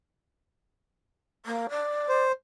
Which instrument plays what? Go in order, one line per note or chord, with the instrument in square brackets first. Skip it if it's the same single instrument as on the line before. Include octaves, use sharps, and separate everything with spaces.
[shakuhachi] A#3
D5
[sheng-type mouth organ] C5